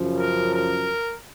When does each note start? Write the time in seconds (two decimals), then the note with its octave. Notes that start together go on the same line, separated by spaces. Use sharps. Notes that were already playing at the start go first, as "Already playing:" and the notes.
Already playing: F#2 C#3 F3
0.18 A#4
0.52 A#4